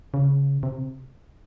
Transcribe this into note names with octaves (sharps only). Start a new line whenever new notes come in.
C#3
C3